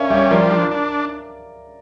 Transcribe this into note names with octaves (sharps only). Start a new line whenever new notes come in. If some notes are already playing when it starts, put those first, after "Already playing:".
Already playing: C#4 A#4 C#5 D5 E5 F5
G3 C#5 E5
F3 A#4 D5
D4
D4